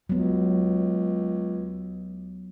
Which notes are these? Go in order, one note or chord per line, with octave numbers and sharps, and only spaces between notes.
C#2 F#3 B3